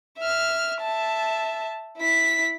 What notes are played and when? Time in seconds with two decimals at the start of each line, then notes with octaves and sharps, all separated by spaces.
0.18 E5 F6
0.81 E5 A5
1.98 E4 B6